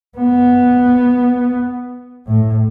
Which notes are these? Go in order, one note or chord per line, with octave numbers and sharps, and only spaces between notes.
B3
A2